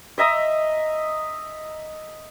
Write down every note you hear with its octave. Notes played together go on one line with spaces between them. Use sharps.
D#5 E5 A#5 D#6